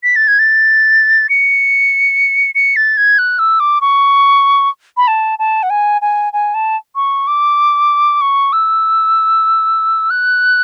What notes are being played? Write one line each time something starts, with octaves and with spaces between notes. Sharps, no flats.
B6
A6
G#6
A6
C#7
C#7
A6
G#6
F#6
E6
D6
C#6
B5
A5
A5
F#5
G#5
G#5
G#5
A5
C#6
D6
C#6
E6
F#6